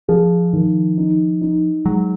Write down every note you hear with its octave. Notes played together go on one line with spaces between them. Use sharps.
F3 G#4
D#3
D#4
D#4
F#3 G#3